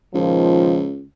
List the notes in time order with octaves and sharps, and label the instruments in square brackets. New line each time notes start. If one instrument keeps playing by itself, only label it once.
[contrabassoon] C#2 [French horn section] A#2 D#3 F3